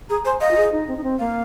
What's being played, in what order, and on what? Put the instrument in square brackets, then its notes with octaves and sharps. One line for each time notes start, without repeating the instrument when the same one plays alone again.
[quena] G#4 [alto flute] A#5
[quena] C5 [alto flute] G#5
[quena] D#5 [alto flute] F5
[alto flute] F4
G#4
D#4
C4
D#4
C4
[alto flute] A#3 [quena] F5